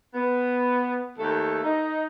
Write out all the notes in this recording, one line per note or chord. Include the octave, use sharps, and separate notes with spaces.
B3
D#2 A3 A4
D#4